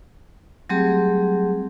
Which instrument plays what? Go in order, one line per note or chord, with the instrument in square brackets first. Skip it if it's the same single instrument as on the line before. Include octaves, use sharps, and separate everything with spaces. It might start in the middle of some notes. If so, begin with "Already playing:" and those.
[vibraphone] F#3 G3 A3 C4 G4 G#4